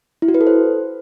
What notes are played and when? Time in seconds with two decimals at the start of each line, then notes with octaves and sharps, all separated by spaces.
0.22 E4
0.28 F#4
0.34 B4
0.41 A4
0.47 C5